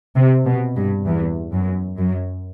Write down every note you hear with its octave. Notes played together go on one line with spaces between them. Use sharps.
C3
B2
G2
E2
F#2
F#2